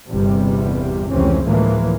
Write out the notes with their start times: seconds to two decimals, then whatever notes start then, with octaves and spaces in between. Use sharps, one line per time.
0.10 G1 E2 C3 G3
1.09 F1 C#2 C3 E3 C4 C#4
1.45 D2 A2 E3 F3 G#3 A#3